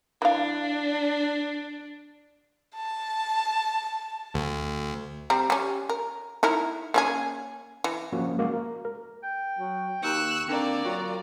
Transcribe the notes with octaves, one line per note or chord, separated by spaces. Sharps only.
E3 D4 F5
A5
D2
G3 C4 A#5
G3 C#4
A#4
D#4 E4 A#4
A#3 C#4 G#4
E3
F3 A#3 C#4 F#4
G#3 A#3 F#4
A#4
A#4
G5
F#3
D#2 C#6 E6 F#6
D3 A#3 C4 D5
F#3 F4